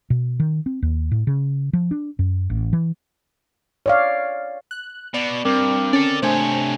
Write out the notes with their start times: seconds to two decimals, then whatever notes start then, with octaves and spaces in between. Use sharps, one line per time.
0.10 B2
0.40 D#3
0.66 C4
0.82 D#2
1.12 A2
1.27 C#3
1.73 F3
1.91 D4
2.19 F#2
2.50 A1
2.73 E3
3.86 C#5 D5 F5
4.71 F#6
5.14 B2 D5
5.45 G2 C4 A#4 D6
5.93 C#4 A4 D5
6.22 C3 A3 D4 C5 C#5 G#5